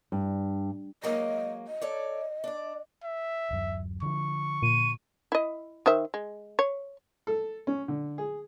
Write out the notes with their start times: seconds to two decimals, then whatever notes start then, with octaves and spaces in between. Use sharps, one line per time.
0.12 G2
1.03 F#3 G#3 A#3 D#5
1.67 D#5
1.82 A4 C#5 D5
2.44 D4 D5
3.04 E5
3.50 D1 F#2
4.02 D3 F3 C#6
4.62 A#2 D#7
5.32 E4 D#5
5.86 D#3 C5 E5
6.14 G#3
6.59 C#5
7.27 A4
7.67 C#4
7.88 D3
8.18 G#4